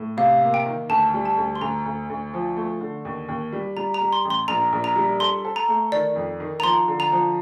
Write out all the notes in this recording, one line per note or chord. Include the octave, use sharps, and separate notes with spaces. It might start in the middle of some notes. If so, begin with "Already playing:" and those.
Already playing: A2
C3 F5
A#3
G5
D#3
D2 A5
G3
A5
D2
C6
D2 A#5
D2
D2
F3
A3
D3
D#2
D#2
G3
G3 A#5
A#5
G3
C6
A1
C6
A#1 A#5
A#1
A#5
G3
A4 C6
A4
A#5
A3
D#3 D5
F2
D#3
A#5
F3 C6
D3
A#5
F3